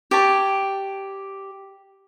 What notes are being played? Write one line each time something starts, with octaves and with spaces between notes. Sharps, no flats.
G4 C#5 A5